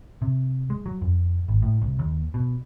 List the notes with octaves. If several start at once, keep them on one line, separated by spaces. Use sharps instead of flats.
C3
G#3
F#3
F2
G#1
A2
C2
D#2
B2